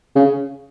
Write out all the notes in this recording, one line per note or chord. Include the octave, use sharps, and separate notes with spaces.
C#3